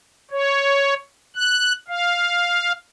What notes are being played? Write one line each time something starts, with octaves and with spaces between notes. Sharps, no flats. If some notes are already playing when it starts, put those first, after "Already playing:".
C#5
F#6
F5